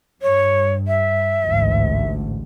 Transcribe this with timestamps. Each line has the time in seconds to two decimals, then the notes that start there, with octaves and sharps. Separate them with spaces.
0.22 G2 C#5
0.87 E5
1.44 A1 D2 G#2